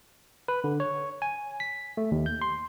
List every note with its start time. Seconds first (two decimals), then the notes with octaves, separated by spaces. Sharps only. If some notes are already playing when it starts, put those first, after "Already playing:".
0.48 B4
0.64 D3
0.80 C#5
1.22 G#5
1.60 B6
1.97 A3
2.12 D#2
2.26 G6
2.42 C6